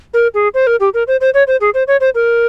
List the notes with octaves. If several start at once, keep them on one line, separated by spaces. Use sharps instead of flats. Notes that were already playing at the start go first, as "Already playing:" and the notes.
A#4
G#4
C5
A#4
G4
A#4
C5
C5
C#5
C5
G#4
C5
C#5
C5
A#4